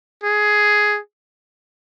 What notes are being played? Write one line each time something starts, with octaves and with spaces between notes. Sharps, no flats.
G#4